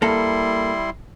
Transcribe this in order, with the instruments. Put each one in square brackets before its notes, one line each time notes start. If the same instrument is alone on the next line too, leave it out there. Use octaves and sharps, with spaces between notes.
[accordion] G3 E4 C6 [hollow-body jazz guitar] A#3 A4